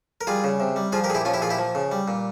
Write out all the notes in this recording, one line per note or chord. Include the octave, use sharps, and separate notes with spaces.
A#4
G3 F4 G#4
C#3
C3
G3
F3 F4 G#4
G4 A#4
A#2 G#4
E4 G4
F3 C#4 F4
E4 G4
A#2 F4 G#4
E4 G4
F3
C#3
G3
A#2